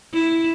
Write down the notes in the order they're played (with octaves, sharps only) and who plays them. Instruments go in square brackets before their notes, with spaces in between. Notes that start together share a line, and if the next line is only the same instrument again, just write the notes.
[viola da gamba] E4